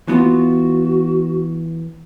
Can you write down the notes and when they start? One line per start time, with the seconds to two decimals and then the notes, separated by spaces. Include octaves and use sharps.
0.08 E3 B3 F4 F#4